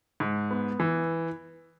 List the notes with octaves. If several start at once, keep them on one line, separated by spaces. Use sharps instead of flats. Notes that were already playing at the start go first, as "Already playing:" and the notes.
G#2
B3
E3